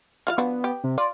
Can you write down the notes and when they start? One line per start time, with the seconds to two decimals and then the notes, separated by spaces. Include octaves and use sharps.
0.27 E3 F4 F5 F6
0.38 F3 B3 D4 F#4
0.64 G4
0.84 C3
0.98 F4 D5